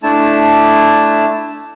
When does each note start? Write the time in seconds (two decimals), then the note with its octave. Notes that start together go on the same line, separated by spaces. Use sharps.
0.03 A3 D4 E4 A5